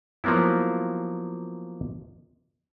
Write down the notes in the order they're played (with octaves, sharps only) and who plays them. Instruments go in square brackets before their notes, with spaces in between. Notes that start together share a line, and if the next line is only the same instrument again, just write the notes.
[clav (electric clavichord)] F3 F#3 A#3 B3 E4